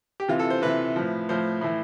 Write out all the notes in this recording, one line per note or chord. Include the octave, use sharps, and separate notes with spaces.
G4
C3 E3 F4
A4
C5
C3 E3 B4
A2 F3
A2 F3 C5
A2 E3